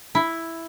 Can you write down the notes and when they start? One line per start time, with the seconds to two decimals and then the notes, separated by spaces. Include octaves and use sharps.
0.15 E4